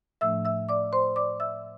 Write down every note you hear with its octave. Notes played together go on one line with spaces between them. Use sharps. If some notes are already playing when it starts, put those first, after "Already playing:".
A2 F3 A3 D4 E5 E6
E5 E6
D5 D6
C5 C6
D5 D6
E5 E6